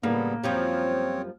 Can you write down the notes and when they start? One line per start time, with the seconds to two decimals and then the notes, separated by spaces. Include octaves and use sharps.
0.03 A2 C#3 G3 A#3 B3
0.43 F#2 F3 G3 C4 C#5